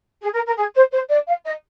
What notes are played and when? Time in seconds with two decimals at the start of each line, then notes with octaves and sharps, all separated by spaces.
0.22 G#4
0.34 A#4
0.47 A#4
0.57 G#4
0.75 C5
0.92 C5
1.09 D5
1.27 F5
1.45 D#5